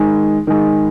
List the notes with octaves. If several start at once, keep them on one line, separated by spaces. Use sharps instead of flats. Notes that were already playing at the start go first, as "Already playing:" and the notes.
Already playing: D#3 G#3
D#3 G#3